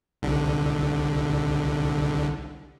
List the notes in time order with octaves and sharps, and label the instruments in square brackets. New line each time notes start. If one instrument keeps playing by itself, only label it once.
[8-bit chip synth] C2 D3